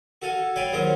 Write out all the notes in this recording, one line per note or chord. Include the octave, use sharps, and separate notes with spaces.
F#4 A4 F5 G#5
C#5 D5 F5 G5 G#5 B5
D#2 F#3 G#4 C5 F5 A#5